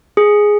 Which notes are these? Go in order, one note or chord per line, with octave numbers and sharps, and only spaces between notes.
G#4